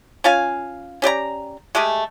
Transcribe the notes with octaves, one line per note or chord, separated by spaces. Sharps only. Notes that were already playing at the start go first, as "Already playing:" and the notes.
C#4 F4 F5 G#5
C#4 G4 D5 A#5
G#3 A3 G4 G#4